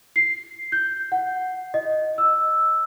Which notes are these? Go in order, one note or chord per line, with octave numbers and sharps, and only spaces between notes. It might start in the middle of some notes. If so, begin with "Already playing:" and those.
C7
G6
F#5
D#5
E6